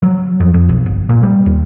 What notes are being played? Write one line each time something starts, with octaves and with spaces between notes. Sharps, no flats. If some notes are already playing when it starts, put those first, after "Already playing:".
F#3
F2
F2
B1
G1
A#2
G3
D#2